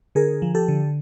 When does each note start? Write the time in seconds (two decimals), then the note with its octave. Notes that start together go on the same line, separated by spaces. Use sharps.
0.15 D3 G#4 A#4
0.42 F3
0.55 G4 A4
0.68 D3